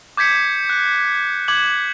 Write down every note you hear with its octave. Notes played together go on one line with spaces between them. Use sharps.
D6 G6 G#6 B6 C#7
F#6
D6 G#6 F#7